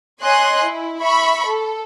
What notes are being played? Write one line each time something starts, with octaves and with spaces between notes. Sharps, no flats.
C#5 D#5 G#5 C6 F#6
E4
E5 B5 C#6
A4